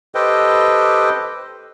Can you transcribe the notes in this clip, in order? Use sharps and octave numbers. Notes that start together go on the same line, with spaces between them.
G4 A4 B4 C5 D#5 G5